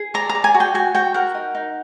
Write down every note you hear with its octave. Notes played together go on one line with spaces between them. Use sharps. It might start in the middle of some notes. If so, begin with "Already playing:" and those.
Already playing: G#4
D5 A#5
A#5
D5
G#5
F#4
G5
F#4 G#5
F#4 G5
A#4 F#5
D#4
D#4